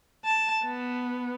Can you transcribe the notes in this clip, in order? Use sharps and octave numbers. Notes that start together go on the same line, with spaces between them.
A5
B3